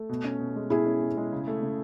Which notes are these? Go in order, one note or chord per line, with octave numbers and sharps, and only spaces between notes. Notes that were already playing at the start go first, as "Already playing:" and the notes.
Already playing: A3
B2
C#4
B2
G#3
B2 E4 G#4
C#4
B2
G#3
C#3
A3
C#3